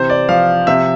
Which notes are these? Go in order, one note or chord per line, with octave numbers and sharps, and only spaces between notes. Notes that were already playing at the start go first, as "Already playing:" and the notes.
Already playing: C3 E3 C5
D5
F3 F5
C3 E5